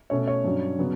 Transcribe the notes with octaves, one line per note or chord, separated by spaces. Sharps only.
B2 A3 C#4 C#5
C#5
G2 F#3 C#4
C#3 F#3 B3